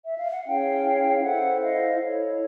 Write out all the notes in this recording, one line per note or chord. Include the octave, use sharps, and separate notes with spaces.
E5
F5
F#5
C#4 E4 G#4 C#5 F5 G5
E4 A4 C5 E5 F#5
D#5 F5
E4 A4 C#5